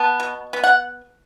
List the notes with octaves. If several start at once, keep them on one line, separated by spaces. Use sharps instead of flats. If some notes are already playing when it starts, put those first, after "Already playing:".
Already playing: B3 A5
B2
B3
F#5